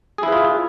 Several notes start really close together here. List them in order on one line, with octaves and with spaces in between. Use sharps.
G#4 E4 B4 F4